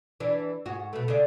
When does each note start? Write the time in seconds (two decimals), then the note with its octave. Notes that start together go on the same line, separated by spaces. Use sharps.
0.20 E3 D4
0.66 G#2 F#4
0.93 B2 A3
1.08 C#3 D4